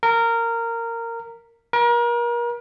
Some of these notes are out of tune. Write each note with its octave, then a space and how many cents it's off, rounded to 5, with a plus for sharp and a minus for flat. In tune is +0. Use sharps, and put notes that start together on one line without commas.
A#4 -15
A#4 +35